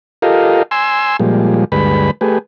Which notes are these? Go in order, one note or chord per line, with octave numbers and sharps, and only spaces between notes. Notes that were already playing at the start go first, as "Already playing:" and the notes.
F4 G4 A4 A#4 D#5 F5
G#5 C6 E6
A#2 F3 G3 G#3
D2 G2 G#3 B4 B5
A3 G4 G#4 B4